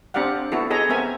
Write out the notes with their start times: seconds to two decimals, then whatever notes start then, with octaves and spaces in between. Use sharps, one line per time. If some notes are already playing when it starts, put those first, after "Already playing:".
0.14 C4 D4 G4 D5 F5 F#5
0.52 B3 E4 F#4 A4
0.71 G#4 A4 C#5 D#5 A#5
0.90 B3 C4 A#4 E5 G#5